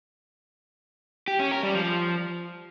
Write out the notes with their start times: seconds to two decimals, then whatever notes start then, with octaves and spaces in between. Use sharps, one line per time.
1.28 G4
1.39 C#4
1.51 A#4
1.63 G3
1.75 F3